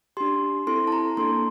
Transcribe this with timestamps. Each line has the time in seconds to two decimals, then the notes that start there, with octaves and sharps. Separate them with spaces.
0.17 D4 G4 C6
0.67 C4 E4 A4 C6
0.87 A5
0.92 A#5
1.17 A#3 D4 A4 C6